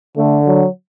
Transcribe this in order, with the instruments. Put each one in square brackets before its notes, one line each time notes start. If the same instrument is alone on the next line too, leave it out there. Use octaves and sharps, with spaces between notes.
[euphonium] D3 [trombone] A3
[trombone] F#3